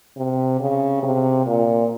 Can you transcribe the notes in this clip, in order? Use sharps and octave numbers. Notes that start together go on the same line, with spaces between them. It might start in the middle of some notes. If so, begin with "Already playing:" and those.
C3
C#3
C3
A#2